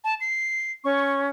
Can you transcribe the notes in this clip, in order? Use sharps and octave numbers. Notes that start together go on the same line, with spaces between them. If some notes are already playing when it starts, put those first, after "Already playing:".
A5
C7
C#4 C#6